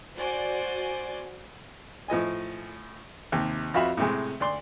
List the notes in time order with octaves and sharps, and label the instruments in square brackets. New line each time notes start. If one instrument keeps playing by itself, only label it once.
[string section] F#4 C5 D5 G#5
[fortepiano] A2 F3 D#5 G#5
D#2 C3
F2 F4 F#4 E5 F5 B5
A2 C3 G#3
D2 D5 C6